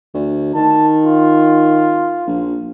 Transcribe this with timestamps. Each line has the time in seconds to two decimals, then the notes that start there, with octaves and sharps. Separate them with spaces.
0.14 D2
0.55 D#3 A5
1.05 F4
2.27 A#1